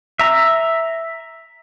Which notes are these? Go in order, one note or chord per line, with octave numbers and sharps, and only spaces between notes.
E5 A#5